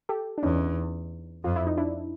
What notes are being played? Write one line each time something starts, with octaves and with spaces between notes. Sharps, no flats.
G4 A4
D4
E2 C#4 D#4
F2 F4
E4
D#4
D4 E4